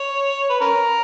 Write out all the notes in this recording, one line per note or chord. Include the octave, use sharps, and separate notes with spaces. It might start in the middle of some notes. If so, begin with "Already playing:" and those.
Already playing: C#5
B4
C#4 A#4